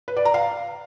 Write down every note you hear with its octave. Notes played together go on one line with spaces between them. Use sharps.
B4
D5
A#5
F5